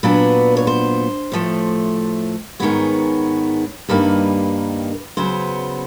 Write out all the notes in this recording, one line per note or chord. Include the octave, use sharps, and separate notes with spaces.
A#2 F#3 B3 D4 B4
C#5
C5
A2 F3 A3
G#2 D#3 G#3 B3 C#5
G2 D#3 G3 A#3 D#4 B4
C#3 F#3 B3 C5